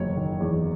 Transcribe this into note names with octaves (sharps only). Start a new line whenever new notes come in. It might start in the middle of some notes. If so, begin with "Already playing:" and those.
Already playing: F#1 E2 D#3 F#3 C#5
D#3
E2